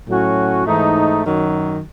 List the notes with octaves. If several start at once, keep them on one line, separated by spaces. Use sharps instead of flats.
A2 F#3 C#4 F#4
G#2 E3 A3 D#4
F#2 D#3 F#3